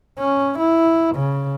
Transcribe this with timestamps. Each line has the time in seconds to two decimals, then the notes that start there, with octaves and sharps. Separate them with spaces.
0.19 C#4
0.59 E4
1.16 C#3